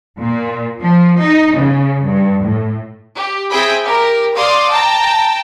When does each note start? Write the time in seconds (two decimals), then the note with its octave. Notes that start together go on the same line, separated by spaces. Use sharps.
0.18 A#2
0.81 F3
1.18 D#4
1.55 C#3
2.04 G2
2.43 A2
3.14 G4
3.50 C4 E4 G#4 G5 B5
3.84 G4 A#4
4.35 D5 F5 C6 D#6
4.70 G5 A5 A#5